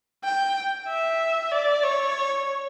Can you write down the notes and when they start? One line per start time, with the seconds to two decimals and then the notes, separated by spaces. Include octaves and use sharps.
0.24 G5
0.88 E5
1.52 D5
1.84 C#5